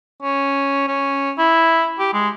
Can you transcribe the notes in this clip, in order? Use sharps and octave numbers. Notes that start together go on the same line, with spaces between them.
C#4
C#4
E4
G4
G#3